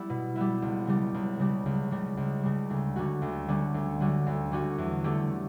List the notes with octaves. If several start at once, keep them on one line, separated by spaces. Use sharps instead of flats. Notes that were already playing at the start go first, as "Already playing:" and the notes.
Already playing: G3 B3 E4
B2
G3 B3 E4
C#2
C#3 G3
C#2
C#3 G3
C#2
C#3 G3
C#2
C#3 G3
D2
D3 G3 C#4 F#4
D2
D3 G3 C#4 F#4
D2
D3 G3 C#4 F#4
D2
D3 G3 C#4 F#4
E2
D3 A3 C#4 G4